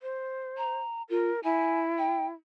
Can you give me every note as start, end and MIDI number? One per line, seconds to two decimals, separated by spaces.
0.02 0.79 72
0.57 1.02 82
1.10 1.31 65
1.10 1.40 70
1.44 2.33 64
1.44 1.80 80
1.98 2.26 79